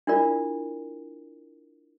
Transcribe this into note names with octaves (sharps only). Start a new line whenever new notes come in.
D4 E4 F4 A#4 D5